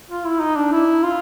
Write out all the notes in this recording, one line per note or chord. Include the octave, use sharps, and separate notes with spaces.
F4
E4
D#4
D4
E4
F4